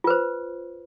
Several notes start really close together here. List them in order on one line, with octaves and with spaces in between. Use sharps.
F4 B4 C5